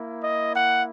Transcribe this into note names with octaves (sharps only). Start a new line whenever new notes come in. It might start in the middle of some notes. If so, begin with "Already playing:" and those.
Already playing: A#3 E4
D#5
F#5